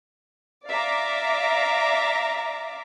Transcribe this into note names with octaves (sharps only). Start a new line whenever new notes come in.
D5 E5 F5 A#5 D6